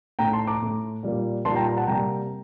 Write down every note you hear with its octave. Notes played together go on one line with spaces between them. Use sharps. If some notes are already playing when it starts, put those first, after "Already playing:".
A2 A3 G5 A#5
A5 C6
A#5 D6
A2 A3
A#2 G3 A#3
A#2 G3 A#3 A5 C6
G5 A#5
A#5
F#5 A5
C3 G3 A#3 G5 A#5